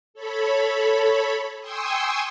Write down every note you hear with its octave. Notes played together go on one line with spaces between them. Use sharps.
A4 C#5 B5
G5 G#5 C6 C#6 D#6 E6